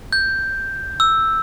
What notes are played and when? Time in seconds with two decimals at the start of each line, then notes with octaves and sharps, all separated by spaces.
0.13 G6
1.00 E6